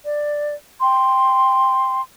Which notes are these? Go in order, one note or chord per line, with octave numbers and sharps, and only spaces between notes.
D5
G5 C6